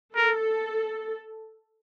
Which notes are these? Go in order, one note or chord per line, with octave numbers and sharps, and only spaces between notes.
A4 A#4